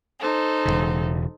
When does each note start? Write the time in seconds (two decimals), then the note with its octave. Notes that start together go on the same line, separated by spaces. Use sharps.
0.20 D#4 A4 C5
0.65 E1 A#1 C#3